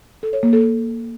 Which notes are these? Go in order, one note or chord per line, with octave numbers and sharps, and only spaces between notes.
A4
C#5
A#3
A4